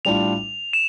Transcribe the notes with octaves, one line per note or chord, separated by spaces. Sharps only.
A2 G3 D4 F4 F7
E7